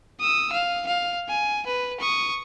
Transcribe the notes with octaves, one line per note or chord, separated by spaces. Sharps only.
D#6 E6
F5
F5
G#5
B4
C#6 D#6